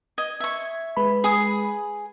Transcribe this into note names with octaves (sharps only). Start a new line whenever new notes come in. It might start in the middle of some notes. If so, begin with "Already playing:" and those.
D#5 G#6
E5 C#6
G#3 B4 B5
G#4 D#6